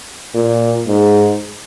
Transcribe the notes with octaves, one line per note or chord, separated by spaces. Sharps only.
A#2
G#2